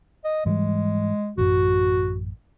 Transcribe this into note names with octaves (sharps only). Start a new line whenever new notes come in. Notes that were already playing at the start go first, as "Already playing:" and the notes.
D#5
G#2 E3 G3 G#3
A1 F#2 F#4